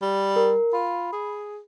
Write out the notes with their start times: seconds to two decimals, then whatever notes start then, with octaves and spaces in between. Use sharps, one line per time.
0.02 G3
0.36 A#4
0.73 F4 B5
1.12 G#4